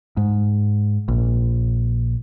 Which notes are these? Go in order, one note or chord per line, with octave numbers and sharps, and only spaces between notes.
G#2
A#1